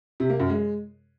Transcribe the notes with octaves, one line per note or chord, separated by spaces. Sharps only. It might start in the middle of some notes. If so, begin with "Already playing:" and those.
C3
A#3
F#2
G#3